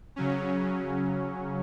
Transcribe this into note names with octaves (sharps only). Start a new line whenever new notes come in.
C#3 F#3 C#4